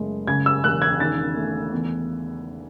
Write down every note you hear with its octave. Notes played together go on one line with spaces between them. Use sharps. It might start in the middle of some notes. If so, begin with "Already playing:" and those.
Already playing: F#1 G#3 A3
C#3 G#6
E6
E1 F#6
G#6
D#3 A6
A3
E2